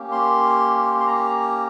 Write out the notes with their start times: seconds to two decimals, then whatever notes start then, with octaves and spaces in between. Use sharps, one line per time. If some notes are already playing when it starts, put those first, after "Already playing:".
Already playing: A#3 C#4 G4
0.12 C6
1.00 C6
1.07 A#5